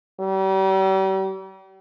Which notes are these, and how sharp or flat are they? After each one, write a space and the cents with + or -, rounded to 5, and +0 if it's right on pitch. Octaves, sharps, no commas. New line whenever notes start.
G3 -40